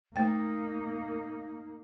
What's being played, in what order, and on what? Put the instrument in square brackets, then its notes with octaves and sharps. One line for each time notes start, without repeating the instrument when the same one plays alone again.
[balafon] A3 G5 [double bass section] A#3 [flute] D#4